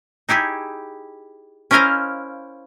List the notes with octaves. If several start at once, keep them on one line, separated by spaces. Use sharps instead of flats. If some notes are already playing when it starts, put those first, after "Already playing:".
D#4 E4 G4 G#4
C#4 E4 A#4 C5 D#5 F5